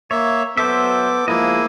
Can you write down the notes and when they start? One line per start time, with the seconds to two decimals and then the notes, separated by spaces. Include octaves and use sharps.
0.11 A#3 C#5 E5
0.57 F#3 B3 A4 C5 E5 D6
1.28 F3 G#3 A#3 E4 D#5